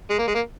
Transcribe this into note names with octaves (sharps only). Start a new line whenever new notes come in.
G#3
A#3
G#3
A#3